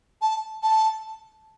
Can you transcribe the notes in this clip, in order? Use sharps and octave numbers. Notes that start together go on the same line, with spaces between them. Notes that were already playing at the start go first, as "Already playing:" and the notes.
A5
A5